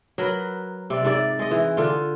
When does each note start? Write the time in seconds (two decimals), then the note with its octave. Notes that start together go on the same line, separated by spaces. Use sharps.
0.18 F#3 A#4 B4
0.90 C3 D5
1.04 G#2 C3 D5 E5
1.39 G#3 D#5
1.51 E3
1.77 D3 F4